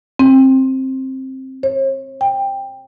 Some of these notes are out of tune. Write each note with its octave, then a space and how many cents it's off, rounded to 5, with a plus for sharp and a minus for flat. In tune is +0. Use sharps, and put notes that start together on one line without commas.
C4 +15
C#5 -45
G5 +10